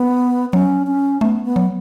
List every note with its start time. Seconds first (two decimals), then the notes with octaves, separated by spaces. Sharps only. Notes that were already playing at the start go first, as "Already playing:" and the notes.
Already playing: B3
0.53 F#3 C#4
0.87 C#4
1.21 A3 B3
1.45 B3
1.56 F#3